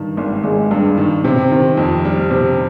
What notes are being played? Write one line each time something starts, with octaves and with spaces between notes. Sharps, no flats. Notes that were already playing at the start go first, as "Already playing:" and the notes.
Already playing: G2 D#3
G#1
G#1 G#3
G2
D#3
C3 C4
D#3
F2
G3
C3